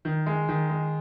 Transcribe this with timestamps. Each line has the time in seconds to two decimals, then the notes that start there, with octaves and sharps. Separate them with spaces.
0.05 D#3
0.26 G#3
0.49 D#3
0.69 G#3